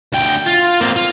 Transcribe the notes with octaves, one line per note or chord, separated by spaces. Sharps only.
D2 G5
F4
A#3 C4
F4